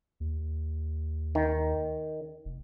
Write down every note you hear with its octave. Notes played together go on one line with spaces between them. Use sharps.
D#2
D#3
F1